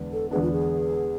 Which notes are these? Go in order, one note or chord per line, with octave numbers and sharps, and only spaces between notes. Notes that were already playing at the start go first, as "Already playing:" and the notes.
Already playing: E2 D3 G#3 B3 D4
A4
E2 D3 G#3 B3 D4 G#4
F4
G#4